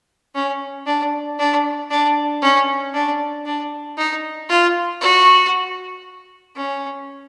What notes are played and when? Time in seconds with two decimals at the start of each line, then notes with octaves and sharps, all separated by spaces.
0.35 C#4
0.86 D4
1.39 D4
1.90 D4
2.42 C#4
2.94 D4
3.46 D4
3.98 D#4
4.49 F4
5.01 F#4
6.56 C#4